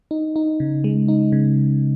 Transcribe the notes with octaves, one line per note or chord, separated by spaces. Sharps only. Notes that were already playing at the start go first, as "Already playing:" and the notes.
D#4
D#4
C#3
G#3
D#4
C#3